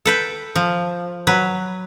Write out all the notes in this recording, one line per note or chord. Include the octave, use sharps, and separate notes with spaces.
A4 B4 G5
F3
F#3 B4